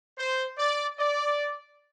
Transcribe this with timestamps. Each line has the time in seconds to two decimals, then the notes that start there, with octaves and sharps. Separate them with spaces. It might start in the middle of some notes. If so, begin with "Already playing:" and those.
0.18 C5
0.58 D5
0.99 D5